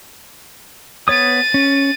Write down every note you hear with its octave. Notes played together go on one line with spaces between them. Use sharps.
B3 C#5 D#6 A6 D#7
C#4